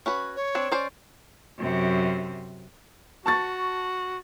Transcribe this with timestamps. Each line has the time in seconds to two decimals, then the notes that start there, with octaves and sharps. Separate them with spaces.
0.06 C#4 F#4 B4
0.36 C#5
0.55 C4 D4
0.72 C#4 C5 D5
1.58 F#2 C3
3.26 F#4 A5 C#6 A6